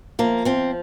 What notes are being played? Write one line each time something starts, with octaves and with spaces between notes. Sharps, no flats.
F3 A#3
F3 C4